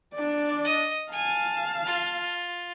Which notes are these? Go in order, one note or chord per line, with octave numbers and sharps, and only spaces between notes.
D4 D5
D#5
F5 G#5 A5
F4